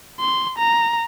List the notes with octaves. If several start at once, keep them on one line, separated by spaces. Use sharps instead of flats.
C6
A#5